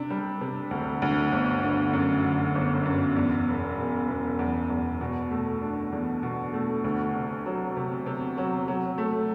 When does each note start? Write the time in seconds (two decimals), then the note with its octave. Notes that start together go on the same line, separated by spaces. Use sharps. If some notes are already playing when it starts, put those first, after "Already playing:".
Already playing: C3 D4
0.10 G3
0.41 C3
0.71 D2
1.02 D2
1.32 G1
1.63 D3
1.93 F#2
2.24 D3
2.55 G1
2.85 F#2
3.16 E2
3.48 E1
3.77 E1
4.08 E1
4.39 E2
4.70 E2
5.01 B2
5.31 A3
5.62 D4
5.92 E2
6.23 B2
6.53 A3
6.84 D2
7.14 C3
7.46 F#3
7.77 C3
8.06 C3
8.38 F#3
8.68 F#3
8.98 A3